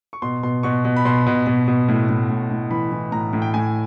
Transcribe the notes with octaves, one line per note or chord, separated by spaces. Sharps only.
C#6
B2 C6
B2 C6
B2 C#6
B2
B5
B2 C6
B2
B2
B2
A2
A2
A2
A2
E3 B5
E3
A2 A#5
A2
G5
A2 G#5